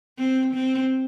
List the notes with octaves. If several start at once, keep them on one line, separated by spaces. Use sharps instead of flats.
C4
C4